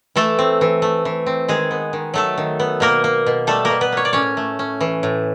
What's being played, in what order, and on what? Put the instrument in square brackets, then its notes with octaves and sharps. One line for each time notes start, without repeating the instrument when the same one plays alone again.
[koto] E3 A3 A4
C4
E3
A3
E3
C4
D#3 G#3 G#4
B3
D#3
F#3 A3 A4
D#3
B3
B2 A#3 A#4
A#3
B2
G3 A3 A4
A#3 A#4
B2
B3 B4
A#3 C#5
D5
A2 C#4 C#5
A3
C#4
E3
A2